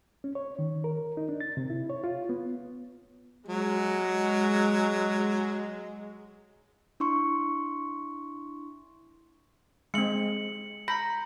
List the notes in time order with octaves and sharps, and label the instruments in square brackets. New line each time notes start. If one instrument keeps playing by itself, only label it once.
[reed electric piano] C#4
C#5
D#3
A#4
D#4
D4
A6
C3
E4
C#5
F4
B3
[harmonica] F#3 [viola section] G#3
[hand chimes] D4 E4 C6 C#6
[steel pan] G#3 C4 [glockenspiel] C#7 F#7
[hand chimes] A#5 G6 [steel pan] B5 [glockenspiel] A#6